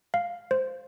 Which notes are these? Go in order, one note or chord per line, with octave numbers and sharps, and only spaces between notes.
F5
C5